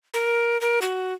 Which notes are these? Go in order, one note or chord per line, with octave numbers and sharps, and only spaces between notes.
A#4
A#4
F#4